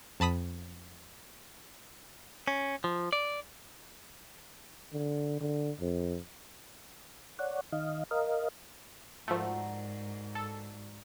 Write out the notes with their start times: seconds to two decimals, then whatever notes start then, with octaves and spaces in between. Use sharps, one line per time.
0.20 F2 A5 B5 D#6 B6
2.48 C#4
2.84 F3
3.13 D5
4.93 D3
5.41 D3
5.80 F2
7.39 C#5 D5 F#5
7.72 D#3 D#5 F5
8.11 A#4 D#5 F5
9.28 G#2 F3 A3 F#4 A#4 D5
10.35 A4